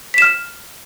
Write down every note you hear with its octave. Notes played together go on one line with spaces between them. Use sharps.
F6 B6 E7